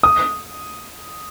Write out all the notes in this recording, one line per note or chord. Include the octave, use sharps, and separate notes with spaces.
D#6